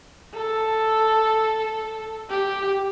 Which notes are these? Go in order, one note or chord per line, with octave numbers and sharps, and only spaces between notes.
A4
G4